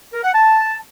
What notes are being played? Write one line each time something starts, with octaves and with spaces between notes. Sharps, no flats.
A#4
F#5
A5